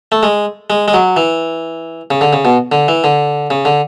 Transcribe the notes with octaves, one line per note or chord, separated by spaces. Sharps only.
A3
G#3
G#3
G#3
F#3
E3
C#3
D3
C#3
B2
D3
E3
D3
C#3
D3